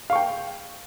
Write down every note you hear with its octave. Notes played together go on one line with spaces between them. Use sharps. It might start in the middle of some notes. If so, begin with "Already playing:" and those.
F5 G5 C#6